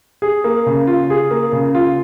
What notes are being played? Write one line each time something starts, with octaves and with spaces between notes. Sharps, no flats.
G#4
A#3
C#3
F4
G#4
A#3
C#3
F4